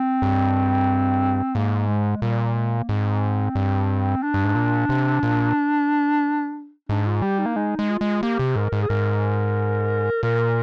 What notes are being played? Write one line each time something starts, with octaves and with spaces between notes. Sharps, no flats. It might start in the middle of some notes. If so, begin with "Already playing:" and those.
Already playing: C4
G2
G#2 A#3
G#3
A#2 G3
G#3
A#3
G#2 C4
G2
D4
G2
G#2
A#2
C3
A#2
G#2 D4
F4
G3 G4
D#4
A#3
G#3 D#4
G#3
F4
G#3
A#3 G4
C3
G#2 A#4
G#2
G#4
G#2 A#4
A#2 A#4